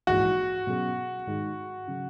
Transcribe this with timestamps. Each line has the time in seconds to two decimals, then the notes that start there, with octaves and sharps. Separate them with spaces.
0.07 A#1 G#2 E3 G#3 F#4
0.67 B2 F#3 C#4 G#4
1.27 G#2 D#3 G#3 D#4 G#4
1.88 C#3 F#3